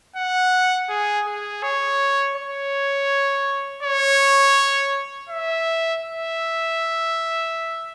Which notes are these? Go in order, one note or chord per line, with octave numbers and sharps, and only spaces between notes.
F#5
G#4
G#4
C#5
C#5
C#5
E5
E5